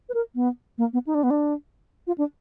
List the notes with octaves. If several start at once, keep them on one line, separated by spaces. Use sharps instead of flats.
B4
A#4
B3
A#3
B3
D#4
D4
B3
D4
F4
D4